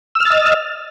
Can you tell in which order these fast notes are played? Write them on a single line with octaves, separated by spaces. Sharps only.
E6 F6 A6 D#5